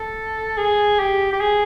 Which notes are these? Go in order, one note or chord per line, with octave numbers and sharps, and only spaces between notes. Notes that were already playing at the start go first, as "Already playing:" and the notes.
Already playing: A4
G#4
G4
G4
G#4